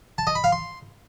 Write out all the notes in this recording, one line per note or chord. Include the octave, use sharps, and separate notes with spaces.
A5
D#5
B5
F5
C6